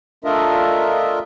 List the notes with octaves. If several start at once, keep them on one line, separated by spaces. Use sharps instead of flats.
A3 D4 F4 A#4 D#5 E5